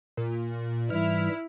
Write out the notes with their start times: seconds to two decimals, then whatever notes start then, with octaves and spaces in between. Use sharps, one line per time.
0.17 A#2
0.90 G#2 E3 G3 E4 F6